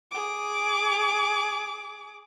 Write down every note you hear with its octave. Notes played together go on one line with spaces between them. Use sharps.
G#4 D6